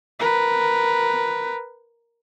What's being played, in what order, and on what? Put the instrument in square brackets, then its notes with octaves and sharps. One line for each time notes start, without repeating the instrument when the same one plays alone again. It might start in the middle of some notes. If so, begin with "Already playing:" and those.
[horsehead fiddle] A#4 B4